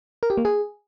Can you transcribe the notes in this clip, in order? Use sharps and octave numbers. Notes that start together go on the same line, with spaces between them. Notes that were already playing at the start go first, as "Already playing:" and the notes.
A#4
G4
A#3
G#4